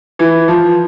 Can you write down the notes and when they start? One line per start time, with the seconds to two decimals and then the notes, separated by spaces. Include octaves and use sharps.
0.19 E3
0.48 F3